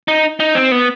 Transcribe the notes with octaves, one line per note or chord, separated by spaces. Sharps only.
D#4
D#4
C4
B3